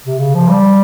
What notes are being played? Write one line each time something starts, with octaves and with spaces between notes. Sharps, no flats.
C3
C#3
F3
G3